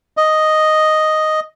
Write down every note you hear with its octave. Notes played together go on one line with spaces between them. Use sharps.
D#5